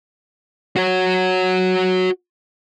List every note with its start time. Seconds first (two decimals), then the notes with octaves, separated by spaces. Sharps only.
0.76 F#4 C#5